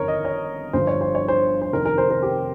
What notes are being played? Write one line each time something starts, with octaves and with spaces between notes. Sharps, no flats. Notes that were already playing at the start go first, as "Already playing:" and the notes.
Already playing: G1 F2 D#3 A#4 C#5
D#5
C#5
G1 G2 F3 C5
C#5
C5
C#5
C5
C5
F1 F2 D#3 A#4
A#4
C5
A#4
G4